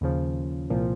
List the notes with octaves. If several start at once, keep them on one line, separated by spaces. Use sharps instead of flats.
D#2 C#3 F3
C2 A#2 F3